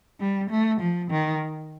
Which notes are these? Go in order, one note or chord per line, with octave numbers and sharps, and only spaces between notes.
G3
A3
F3
D#3